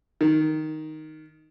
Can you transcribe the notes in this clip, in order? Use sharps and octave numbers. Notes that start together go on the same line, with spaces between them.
D#3